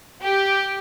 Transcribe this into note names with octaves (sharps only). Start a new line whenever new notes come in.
G4